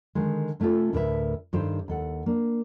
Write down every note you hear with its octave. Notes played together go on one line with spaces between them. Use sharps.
D3 D#3 G#3
C3 A3 C#4 F4 A4
D2 A2 A#4 B4 D5 E5
G2 D#3 G4 A4 C5
D#2 A4 F#5
A#3 D4